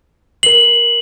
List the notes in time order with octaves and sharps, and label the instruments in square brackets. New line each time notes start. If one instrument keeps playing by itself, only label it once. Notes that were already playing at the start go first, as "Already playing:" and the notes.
[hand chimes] A#4 C7 [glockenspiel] F#7